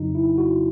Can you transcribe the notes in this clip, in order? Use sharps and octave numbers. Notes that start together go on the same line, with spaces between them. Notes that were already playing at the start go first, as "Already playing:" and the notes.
Already playing: F2 C#3 F#3 D#4
E4
F#4